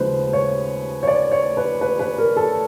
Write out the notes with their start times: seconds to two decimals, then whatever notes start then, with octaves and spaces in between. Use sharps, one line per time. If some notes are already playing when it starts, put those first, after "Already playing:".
Already playing: D#2 C#3 F3 G#3 C#4 B4 C5
0.33 C#5
1.03 C#5
1.07 D5
1.31 C#5
1.57 B4
1.81 B4
1.99 B4
2.18 A#4
2.37 A4